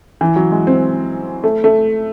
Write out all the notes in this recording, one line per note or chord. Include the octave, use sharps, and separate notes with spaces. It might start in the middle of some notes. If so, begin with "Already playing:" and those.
E3
F#3
G#3
C4
A3
A3